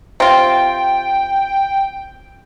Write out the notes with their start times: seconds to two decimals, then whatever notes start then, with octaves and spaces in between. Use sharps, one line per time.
0.20 C3 F4 G5